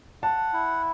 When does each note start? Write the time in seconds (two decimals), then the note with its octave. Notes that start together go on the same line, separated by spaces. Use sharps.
0.23 F#5 A5
0.53 E4